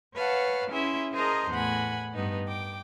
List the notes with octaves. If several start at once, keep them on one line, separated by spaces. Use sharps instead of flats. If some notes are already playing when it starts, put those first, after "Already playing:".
B4 C#5 F5 F#5 A5
C#4 E4 G#4 E5 C6
G#4 A#4 C5 D#5 A5 A#5
E2 A2 F#5 G#5 B5
G2 B3 D#4
G5 D6